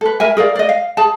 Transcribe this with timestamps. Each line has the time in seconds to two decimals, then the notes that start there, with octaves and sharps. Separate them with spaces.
0.01 A4 B4
0.20 A#4 E5 G#5
0.37 G#4 A#4 D5 F5
0.55 D5 D#5
0.69 F5
0.97 G#4 A5